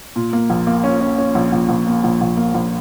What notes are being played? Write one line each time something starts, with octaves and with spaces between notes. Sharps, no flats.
A#2
A#3
A#1
A#3
C#4
C#4
C#4
A#1
A#1
A#1
A#3
A#1
A#1
A#3
A#1